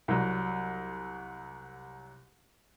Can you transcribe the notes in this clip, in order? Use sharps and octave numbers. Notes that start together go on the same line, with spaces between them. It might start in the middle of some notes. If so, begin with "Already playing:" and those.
C2 F#3